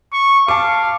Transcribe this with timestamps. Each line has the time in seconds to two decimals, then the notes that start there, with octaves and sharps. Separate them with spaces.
0.13 C#6
0.48 F5 A5 D6